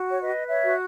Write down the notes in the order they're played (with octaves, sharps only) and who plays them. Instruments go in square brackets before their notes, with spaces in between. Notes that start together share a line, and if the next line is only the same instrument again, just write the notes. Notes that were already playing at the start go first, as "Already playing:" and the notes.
Already playing: [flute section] F#4
C#5
B4 D#5
C#5 E5
F#4